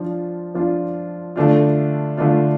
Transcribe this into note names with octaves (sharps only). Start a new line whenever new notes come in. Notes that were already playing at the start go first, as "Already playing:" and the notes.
Already playing: F3 D4 F4
F3 D4 F4
D3 A3 D4 F4
D3 A3 D4 F4